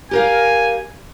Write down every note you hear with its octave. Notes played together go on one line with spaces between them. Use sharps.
G4 A#4 F5 G#5